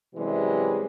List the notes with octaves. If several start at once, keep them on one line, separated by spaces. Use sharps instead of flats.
F#2 C3 E3 G3 G#3